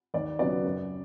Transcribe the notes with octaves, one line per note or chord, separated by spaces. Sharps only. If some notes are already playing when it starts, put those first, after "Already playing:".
D#2 D5
C#3 F#3 B3 D5
F#2